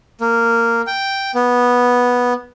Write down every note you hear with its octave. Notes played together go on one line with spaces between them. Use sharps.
A#3
G5
B3